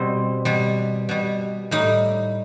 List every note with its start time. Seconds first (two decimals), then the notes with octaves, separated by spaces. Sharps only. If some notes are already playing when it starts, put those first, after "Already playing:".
Already playing: B2 G3 C4
0.45 B2 G3
1.09 B2 G3
1.71 A2 G3 D#4